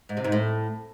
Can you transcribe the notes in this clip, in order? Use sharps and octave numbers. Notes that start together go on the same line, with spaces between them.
G#2
C3
G#2
A2